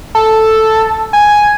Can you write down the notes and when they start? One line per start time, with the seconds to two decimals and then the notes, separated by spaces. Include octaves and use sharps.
0.15 A4
1.13 G#5